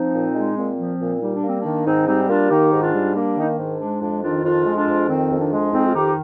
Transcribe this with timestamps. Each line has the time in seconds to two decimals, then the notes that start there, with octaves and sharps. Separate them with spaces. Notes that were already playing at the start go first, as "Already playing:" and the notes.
Already playing: F3 C4 D#4
0.14 A#2
0.35 G#3
0.57 A#2 C4
0.78 F3
1.00 A#2
1.21 G3 D#4
1.35 D4
1.43 A#3
1.48 C4
1.61 D#3 D4
1.86 G#2 C4 D#4
2.07 G3 C4 D#4
2.23 D#4
2.28 A#3 D4 F4
2.50 D#3 D#4 G4
2.72 G#2
2.82 D4 F4
2.94 G3
3.15 A#3 D4
3.36 D#3 D#4
3.47 D4
3.58 G#2
3.80 G#3 D4
4.01 F2 D4
4.23 D#3 D4 F4
4.43 F2 D4 F4
4.65 G#3
4.76 D4 F4
4.87 F2
5.08 D#3 C4
5.30 F2
5.41 D4
5.52 G#3
5.72 F2 C4 D#4
5.87 F4
5.95 D#3 D#4 G4